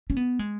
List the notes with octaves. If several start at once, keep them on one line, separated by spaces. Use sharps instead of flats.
C#4
B3
G#3